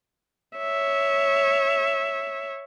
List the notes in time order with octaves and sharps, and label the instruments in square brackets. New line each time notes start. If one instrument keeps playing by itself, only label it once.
[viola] C#5 E5